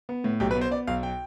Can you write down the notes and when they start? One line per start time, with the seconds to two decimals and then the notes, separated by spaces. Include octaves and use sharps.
0.09 B3
0.24 A2
0.40 B1 G4
0.51 B4
0.56 B3
0.61 C5
0.71 B3 D5
0.87 B1 F5
1.03 G5